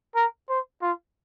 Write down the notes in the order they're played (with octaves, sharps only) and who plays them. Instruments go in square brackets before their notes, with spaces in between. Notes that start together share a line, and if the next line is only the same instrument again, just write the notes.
[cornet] A#4
C5
F4